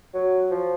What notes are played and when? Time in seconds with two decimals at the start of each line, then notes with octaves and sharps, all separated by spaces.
0.14 F#3
0.50 F3